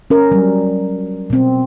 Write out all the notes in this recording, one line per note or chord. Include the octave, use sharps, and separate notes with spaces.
C#4 A#4
F#3 G3
B2 C4